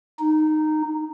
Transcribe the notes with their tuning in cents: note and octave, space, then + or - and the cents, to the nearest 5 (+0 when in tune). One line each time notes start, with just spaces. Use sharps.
D#4 -10